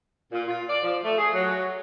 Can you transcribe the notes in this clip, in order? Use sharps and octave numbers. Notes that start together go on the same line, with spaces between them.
A#2
F4
D5
F3
A3
G#4
F#3